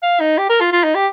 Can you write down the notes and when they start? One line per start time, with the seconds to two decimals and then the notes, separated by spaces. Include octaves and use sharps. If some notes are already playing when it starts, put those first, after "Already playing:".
0.03 F5
0.20 D#4
0.38 G4
0.50 A#4
0.60 F4
0.72 F4
0.84 D#4
0.95 G4